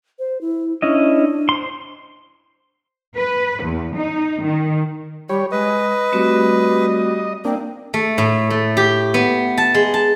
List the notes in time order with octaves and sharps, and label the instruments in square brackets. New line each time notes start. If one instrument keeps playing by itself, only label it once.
[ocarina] C5
E4
[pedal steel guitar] C#4 E4 D#5 [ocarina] D4
[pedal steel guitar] C5 C6
[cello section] B4
E2
D#4
D#3
[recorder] G3 [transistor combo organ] G4 C#5 [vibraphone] B5
[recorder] G#3 [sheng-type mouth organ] B4 [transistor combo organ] D#5
[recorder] G3 [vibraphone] A3 C4 F#4
[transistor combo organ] A#3 D4 [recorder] C4
[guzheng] A3
A2
A3
G4
B3
A5
G#3
A5